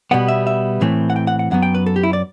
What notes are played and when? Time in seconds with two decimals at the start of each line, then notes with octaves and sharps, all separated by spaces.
0.11 B2 G3 B3 F#5
0.28 E5
0.47 E5
0.81 A2 E3 A3 C4
1.10 F#5
1.16 G5
1.27 F#5
1.39 F#5
1.51 F#2 F#3 B3 F#5
1.62 G5
1.74 B4
1.86 A4
1.96 G4
2.03 E4
2.13 D5